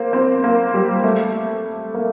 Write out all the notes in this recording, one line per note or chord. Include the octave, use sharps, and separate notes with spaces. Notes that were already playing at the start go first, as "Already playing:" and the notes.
Already playing: A#3 C4
C4
A#3
G3
A3
A#3